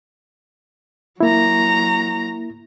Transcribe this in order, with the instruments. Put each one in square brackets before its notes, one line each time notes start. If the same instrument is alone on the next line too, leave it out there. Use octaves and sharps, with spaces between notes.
[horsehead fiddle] F#3 A#5 [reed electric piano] A#3 E4